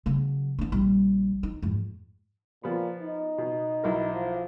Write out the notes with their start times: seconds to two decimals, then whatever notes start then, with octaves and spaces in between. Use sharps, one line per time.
0.06 C#3 F#3
0.59 B3 D4
0.72 A#1 G3
1.43 D#4
1.62 F2 G#2
2.63 A#2 F3 B3
3.03 D#4
3.38 B2
3.83 B1 E4 A#4
4.14 F3